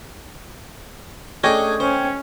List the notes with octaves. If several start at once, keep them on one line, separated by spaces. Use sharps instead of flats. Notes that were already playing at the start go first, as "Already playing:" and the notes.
A3 C#4 D4 G#4 D#5 G5 C#6 G#6
C#4 C5